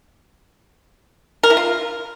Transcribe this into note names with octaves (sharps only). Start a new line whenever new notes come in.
A#4
E4
F4